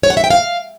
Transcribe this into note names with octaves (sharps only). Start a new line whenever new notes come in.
C#5
F#5
E5
G5
F5